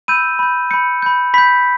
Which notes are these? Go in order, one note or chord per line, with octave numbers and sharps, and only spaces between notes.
B5 E6 G6 D#7
B5 G6
B5 G6 C#7
B5 G6
B5 G6 B6